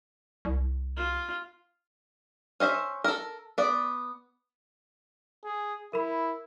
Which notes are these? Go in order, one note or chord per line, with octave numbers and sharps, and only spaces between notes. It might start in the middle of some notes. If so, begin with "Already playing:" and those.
C2
F4
C#4 C5 D#5 E5
A4 A#4
B3 D5
G#4
E4 A#4 B5